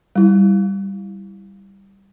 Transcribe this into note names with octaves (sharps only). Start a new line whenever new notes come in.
G3 E4